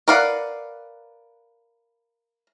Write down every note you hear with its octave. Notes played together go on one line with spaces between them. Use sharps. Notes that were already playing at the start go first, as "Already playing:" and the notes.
A#4 B4 D5 F5 F#5